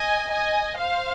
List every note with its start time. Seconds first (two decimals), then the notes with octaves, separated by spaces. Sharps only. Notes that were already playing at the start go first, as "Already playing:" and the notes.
Already playing: D#5 G#5
0.31 D#5 G#5
0.78 C5 F5